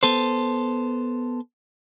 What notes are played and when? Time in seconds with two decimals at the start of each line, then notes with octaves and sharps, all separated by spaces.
0.03 B3 A4 C5